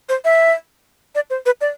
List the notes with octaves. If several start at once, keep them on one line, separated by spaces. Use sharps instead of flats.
C5
E5
D5
C5
B4
D5